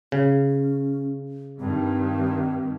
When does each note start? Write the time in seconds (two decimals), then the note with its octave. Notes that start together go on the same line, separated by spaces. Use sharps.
0.12 C#3 C#4
1.59 G2 D#3 C4